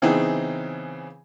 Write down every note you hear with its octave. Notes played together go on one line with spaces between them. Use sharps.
C#3 E3 B3 C4 D#4 G#4